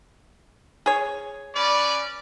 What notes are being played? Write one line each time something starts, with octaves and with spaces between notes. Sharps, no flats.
G#4 C#5
C#4 B4 D5